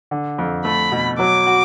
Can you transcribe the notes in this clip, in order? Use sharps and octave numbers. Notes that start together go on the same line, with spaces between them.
D3
F2
A3 B5
B2
F#3 D6
F#4